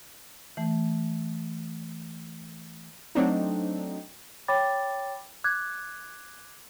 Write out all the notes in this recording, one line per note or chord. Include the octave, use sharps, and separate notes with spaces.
E3 A3
F#3 A3 C4 D4 D#4
C#5 G5 B5 D6 A6
D6 F#6 G#6